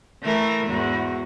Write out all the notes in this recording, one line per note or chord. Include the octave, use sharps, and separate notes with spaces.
E3 A3 A#4
E2 G#2 F#4